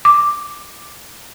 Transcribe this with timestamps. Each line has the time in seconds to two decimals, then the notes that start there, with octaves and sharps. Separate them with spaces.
0.05 D6